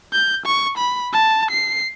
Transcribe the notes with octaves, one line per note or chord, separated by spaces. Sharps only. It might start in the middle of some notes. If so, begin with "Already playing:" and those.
G6
C#6
B5
A5
C7